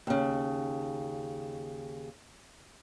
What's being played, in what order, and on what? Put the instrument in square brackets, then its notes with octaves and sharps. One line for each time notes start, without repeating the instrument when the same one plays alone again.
[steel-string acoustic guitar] D#2 C#3